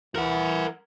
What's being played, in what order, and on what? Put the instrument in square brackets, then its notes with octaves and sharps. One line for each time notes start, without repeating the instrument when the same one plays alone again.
[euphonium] E3 [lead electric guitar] A#4 F#5